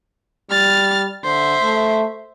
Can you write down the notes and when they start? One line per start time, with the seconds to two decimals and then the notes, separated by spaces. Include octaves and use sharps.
0.51 G3 F6 A6
1.24 D3 C5 E5
1.62 A3